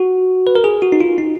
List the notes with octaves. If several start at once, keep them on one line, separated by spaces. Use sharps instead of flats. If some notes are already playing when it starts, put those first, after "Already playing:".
Already playing: F#4
B4
A#4
G#4
F#4
D#4
F4
D#4